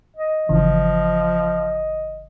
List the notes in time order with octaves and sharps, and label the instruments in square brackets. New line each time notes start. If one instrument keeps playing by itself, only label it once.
[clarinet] D#5
[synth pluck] G1 C#3 E3 [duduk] F3